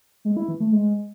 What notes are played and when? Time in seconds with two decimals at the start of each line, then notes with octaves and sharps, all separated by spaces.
0.25 G#3
0.37 E4
0.48 E3
0.60 A3
0.72 G#3